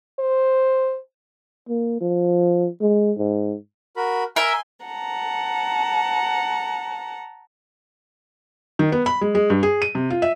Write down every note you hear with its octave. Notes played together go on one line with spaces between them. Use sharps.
C5
A#3
F3
G#3
G#2
F#4 A#4 B5
A#4 E5 G#5 C6
F#5 A5 A#5
D#3
B3
B5
G#3
G#3
G2
G#4
D#7
C3
F4
E5